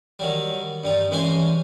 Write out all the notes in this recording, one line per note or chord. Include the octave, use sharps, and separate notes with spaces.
D#3 F#3 G3
G2 G3 D#4
C2 E3 G#3 C#4 C5 G#5